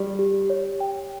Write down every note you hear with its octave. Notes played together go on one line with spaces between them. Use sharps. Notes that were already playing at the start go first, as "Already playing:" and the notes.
Already playing: G3 G4
G4
C#5
G5